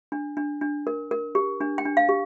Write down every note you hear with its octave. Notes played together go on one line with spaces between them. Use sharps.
D4
D4
D4
A#4
A#4
G4
D4
G5
D4
F5
G4